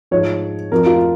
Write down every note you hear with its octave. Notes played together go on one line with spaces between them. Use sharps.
G#2 F3 C#5
F2 F3 A#4
F4